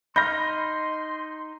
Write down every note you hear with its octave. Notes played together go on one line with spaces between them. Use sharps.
D#4 D#5 B5 C6 F6 G6 A#6